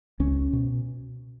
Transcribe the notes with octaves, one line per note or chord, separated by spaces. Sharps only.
C#2 C#4
B2